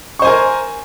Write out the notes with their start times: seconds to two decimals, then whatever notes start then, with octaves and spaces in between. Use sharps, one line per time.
0.19 C#6
0.22 C5
0.25 G#5
0.27 A#4